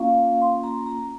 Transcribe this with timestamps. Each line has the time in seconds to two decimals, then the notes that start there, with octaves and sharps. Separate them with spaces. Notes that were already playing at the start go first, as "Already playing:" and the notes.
Already playing: A#3 C#4 F4 F5
0.42 C6
0.64 A#5
0.86 A#5